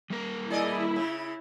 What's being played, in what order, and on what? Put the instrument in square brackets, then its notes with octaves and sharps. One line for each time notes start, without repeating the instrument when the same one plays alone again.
[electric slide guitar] G3 A#3 A#4
[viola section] E4 [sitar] G#4 D5 D#5
[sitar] C#3